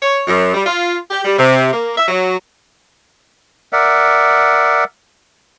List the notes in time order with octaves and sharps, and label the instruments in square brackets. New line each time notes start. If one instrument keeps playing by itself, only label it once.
[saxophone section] C#5
F#2
G3
F4
G4
G3
C3
A#3
E5
F#3
[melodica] A#4 D5 E5 F#5